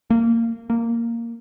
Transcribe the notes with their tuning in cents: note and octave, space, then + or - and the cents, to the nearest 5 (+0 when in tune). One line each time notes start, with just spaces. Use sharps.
A#3 -20
A#3 -5